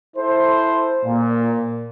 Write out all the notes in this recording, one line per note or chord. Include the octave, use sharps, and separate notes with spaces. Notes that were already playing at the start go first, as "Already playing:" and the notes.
E4 A4 C5
A#2